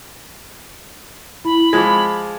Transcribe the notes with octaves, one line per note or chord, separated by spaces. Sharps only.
E4 B5
F3 G#3 D6 G#6